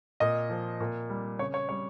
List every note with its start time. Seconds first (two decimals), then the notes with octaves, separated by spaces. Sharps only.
0.20 A#2 D#5
0.50 F3
0.80 A#2
1.10 G3
1.39 C#3 C#5
1.54 C#5
1.69 G3 C#5